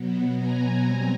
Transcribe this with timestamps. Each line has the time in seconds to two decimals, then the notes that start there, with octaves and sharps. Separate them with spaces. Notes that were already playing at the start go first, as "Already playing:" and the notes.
Already playing: B2 F#3 B3
0.38 G#5 A#5
0.83 G3 C4